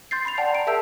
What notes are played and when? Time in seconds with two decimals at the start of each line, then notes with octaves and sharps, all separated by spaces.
0.11 C6 G6 A6 C7
0.25 B5 C6 C7 F7
0.38 D5 F#5 G5 A5
0.52 A#5 D7
0.67 G#4 A#4 E5 A5 E6 G6